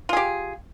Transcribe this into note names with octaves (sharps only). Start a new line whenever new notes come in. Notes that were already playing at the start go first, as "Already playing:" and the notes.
F4 G4 G#4